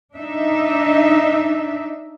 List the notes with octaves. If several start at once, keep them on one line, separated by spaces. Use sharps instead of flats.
D4 D#4 E5